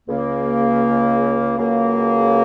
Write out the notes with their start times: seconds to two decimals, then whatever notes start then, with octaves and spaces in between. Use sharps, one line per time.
0.09 C#2 C#3 A#3
1.58 C#2 C#3 F#3 A#3